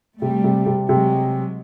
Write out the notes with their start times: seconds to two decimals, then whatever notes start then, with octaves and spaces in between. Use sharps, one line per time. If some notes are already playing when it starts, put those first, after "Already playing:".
0.21 C3 G3 A3
0.44 C3
0.66 C3
0.89 C3 F#3 G#3